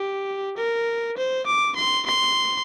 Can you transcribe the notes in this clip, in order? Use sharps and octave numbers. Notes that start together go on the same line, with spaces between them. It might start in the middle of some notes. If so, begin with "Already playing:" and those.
Already playing: G4
A#4
C5
D6
C6
C6